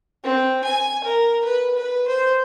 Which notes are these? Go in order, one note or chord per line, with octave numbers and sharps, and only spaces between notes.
C4
G#5
A#4
B4
B4
C5